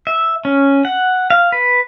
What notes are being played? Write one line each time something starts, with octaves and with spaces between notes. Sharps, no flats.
E5
C#4
F#5
F5
B4